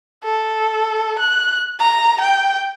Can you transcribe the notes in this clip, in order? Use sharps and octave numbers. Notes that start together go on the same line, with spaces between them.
A4
F#6
A#5
G5